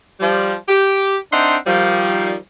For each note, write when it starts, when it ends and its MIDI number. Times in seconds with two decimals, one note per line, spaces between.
0.20 0.54 53
0.20 0.54 55
0.69 1.16 67
1.32 1.56 60
1.32 1.56 62
1.32 1.56 63
1.32 1.56 76
1.32 1.56 78
1.32 1.56 84
1.67 2.35 51
1.67 2.35 53
1.67 2.35 55